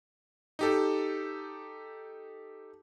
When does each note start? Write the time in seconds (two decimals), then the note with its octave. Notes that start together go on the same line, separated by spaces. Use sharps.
0.59 D#4 G4 A4